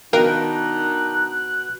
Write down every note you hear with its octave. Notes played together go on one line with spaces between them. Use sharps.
B2 D#3 D4 D#4 A#4 F5 G5 F#6